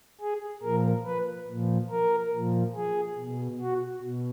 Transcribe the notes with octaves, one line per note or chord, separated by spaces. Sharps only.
G#4
A#2 F3 A#4
B4
A#2 F3
A#4
A#2 F3
G#4
B2
F#4
B2